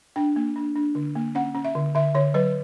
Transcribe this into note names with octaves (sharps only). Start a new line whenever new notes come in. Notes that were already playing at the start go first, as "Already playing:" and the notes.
D4 G5
A#3
D4
D4
D3
A#3
C#4 F#5
C#4
E5
D3
D3 E5
D3 C#5
F#3 B4